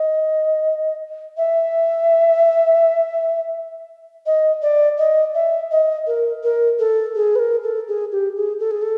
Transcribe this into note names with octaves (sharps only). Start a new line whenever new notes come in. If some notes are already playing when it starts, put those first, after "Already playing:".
Already playing: D#5
E5
D#5
D5
D#5
E5
D#5
A#4
A#4
A4
G#4
B4
A#4
A4
G#4
G4
G#4
A4
G#4
A4